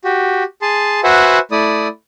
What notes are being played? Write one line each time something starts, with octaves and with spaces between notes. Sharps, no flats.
F#4 G4
G#4 A5 C6
F#4 B4 C5 E5 F#5 G#5
A3 E4 D5 D#6